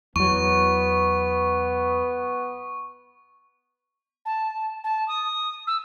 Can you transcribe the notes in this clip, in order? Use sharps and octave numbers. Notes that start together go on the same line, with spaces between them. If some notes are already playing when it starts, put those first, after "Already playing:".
E2 F#3 B3 C#6
A5
A5
D#6
E6